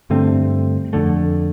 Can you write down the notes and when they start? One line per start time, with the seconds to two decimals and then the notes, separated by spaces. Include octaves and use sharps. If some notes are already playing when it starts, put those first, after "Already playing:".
0.10 G2 D3 A3 C4
0.93 F2 D3 A3